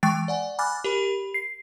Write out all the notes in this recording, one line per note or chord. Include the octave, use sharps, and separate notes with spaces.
E3 G#3 G5 C#6 A6 D7
D5 F#5 G#5
G#5 B5 D6 F6 F#6 A6
G4 A#4 B5
C7